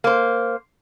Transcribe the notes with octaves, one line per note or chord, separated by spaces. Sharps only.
A#3 C5